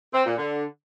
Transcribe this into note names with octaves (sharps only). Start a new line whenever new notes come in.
C4
A#2
D3